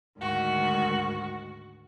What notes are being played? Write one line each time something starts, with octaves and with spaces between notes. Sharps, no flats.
D2 G#2 D#3 F#4